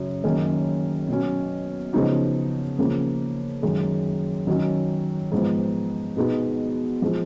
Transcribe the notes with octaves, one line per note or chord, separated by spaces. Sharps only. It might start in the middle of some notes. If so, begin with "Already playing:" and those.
Already playing: F#2 C#3 F#3
F#2 D#3 A#3 C#4 G#4
B2 F#3 C#4
C#3 F3 B3 D#4 F#4
C#3 F3 A#3
F#2 D#3 G#3
D#3 F#3 C#4
G#2 F3 B3
B2 G#3 B3 D#4
F3 G#3